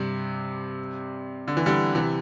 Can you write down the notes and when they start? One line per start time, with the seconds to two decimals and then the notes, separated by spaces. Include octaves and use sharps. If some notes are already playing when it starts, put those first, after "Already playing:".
Already playing: G2 C3
1.48 D3
1.57 E3
1.66 D3 G3
1.95 C3 E3